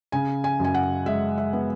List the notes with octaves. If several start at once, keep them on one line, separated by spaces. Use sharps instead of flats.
C#3 G#5
G#5
F#2 G#5
F#5
G#3 E5
E5
B3